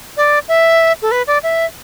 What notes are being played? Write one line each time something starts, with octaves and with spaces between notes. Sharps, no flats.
D5
E5
A4
B4
D5
E5